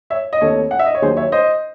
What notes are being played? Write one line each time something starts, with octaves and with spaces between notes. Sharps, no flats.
C#5 E5
D#5
D#2 D#3 A3 C4 A4 C#5
F#5
E5
D#5
C#5
D#2 D#3 F#3 G#4 C5
C#5 E5
C5 D#5